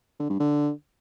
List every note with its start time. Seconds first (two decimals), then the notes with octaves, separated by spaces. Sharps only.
0.20 D3
0.30 G2
0.40 D3